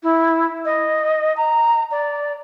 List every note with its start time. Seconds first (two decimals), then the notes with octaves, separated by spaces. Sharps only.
0.03 E4
0.65 D#5
1.37 A#5
1.91 D5